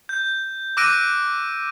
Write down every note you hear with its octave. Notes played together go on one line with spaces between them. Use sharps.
G6
D6 E6 F#6 A#6 D7 D#7